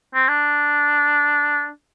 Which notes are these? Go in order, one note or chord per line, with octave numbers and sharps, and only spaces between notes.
C4
D4